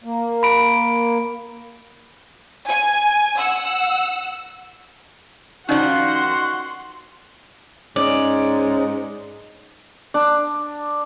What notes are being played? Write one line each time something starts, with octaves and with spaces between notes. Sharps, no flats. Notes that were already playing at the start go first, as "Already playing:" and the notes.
A#3
B5 D7
G#5
F#5 E6
D#3 F3 C#4 D#4 F#4 D5 F#5 C6
G#2 C#4 D5 D#5
D4